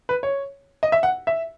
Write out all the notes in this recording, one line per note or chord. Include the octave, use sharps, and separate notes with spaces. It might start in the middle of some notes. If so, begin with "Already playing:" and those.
B4
C#5
D#5
E5
F#5
E5